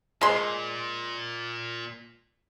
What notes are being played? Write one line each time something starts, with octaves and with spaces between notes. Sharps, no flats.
A#2 G#3 C6